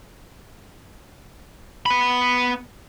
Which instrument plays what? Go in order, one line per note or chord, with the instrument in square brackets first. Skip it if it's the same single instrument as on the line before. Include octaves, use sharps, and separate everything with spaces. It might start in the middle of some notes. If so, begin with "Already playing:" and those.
[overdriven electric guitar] B3 B5